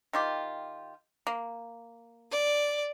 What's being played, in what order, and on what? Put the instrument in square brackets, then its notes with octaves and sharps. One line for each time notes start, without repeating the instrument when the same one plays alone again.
[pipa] D#3 F4 G4
A#3
[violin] D5